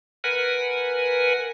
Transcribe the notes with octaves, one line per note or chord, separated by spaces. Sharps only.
A#4 B4 F#5 G#5